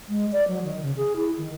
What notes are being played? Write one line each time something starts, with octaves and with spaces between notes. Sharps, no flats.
G#3
D5
F#3
D#3
C#3
G#4
E4
D#3